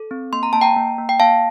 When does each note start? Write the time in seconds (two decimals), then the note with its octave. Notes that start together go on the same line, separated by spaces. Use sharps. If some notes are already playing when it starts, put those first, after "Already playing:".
Already playing: A4
0.11 C4
0.33 A#3 C6
0.43 A#5
0.53 A#3 A5
0.61 G5 A#5
0.76 A#3
0.98 A#3
1.09 G5
1.20 A#3 F5 A5